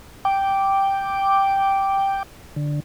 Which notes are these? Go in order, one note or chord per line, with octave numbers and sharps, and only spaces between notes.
G5 D6
D3